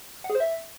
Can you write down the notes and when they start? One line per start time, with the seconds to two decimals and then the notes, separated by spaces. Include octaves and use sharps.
0.24 F#5
0.30 G#4
0.35 C5
0.40 E5